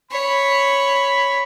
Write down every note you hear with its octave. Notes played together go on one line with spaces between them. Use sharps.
C#5 B5